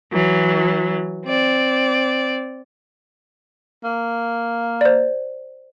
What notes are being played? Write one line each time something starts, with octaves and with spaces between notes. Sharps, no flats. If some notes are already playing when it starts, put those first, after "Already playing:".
E3 F#3
C4 D5
A#3
C5 D5